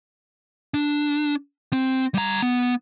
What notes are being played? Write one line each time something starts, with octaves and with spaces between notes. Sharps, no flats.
D4
C4
G3 A#5
B3